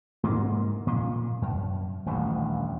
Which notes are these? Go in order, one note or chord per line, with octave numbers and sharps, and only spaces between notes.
G#2 A#3
A#2
F#2
D#1 A1 D2